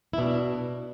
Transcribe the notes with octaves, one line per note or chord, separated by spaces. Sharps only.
E4
B2 D4